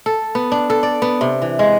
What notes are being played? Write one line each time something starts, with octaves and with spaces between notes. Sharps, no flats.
A4
B3
D4
A4
D5
B3
C3
E3
G#3